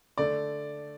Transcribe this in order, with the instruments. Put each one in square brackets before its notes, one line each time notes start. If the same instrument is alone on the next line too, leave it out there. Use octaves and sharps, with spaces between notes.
[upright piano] D3 A3 D5